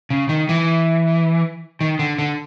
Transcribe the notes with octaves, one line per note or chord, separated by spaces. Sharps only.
C#3
D#3
E3
D#3
D3
D3